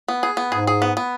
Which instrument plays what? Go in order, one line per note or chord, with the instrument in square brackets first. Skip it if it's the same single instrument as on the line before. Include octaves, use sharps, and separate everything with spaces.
[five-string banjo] B3
G#4
B3
[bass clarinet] G#2 [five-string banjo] G#4
[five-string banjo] G#4
B3
B3